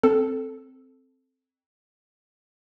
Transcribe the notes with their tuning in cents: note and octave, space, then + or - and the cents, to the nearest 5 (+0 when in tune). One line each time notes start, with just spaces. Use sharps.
C4 +0 A4 +0